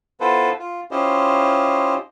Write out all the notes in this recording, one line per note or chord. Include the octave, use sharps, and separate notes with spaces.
B3 E4 F4 A4 B4 C5
F4
C#4 E4 F4 G4 C5 D#5